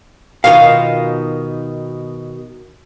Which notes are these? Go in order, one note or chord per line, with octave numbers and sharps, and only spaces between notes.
B2 D#3 F4 F5